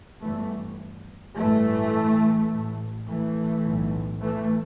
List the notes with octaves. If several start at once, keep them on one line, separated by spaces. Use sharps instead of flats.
G1 G2 E3 A3
A1 G2 E3 A3
A1 A2
E3 A3
B1 A2
E3 A3